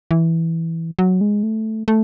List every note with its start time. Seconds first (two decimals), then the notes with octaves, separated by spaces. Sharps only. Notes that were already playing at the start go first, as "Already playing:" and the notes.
0.11 E3
0.99 F#3
1.21 G#3
1.43 A3
1.88 A3